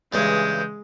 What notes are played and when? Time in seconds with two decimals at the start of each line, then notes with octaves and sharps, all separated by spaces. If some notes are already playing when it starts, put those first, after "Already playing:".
0.13 G2 C#3 E3 G#3 G6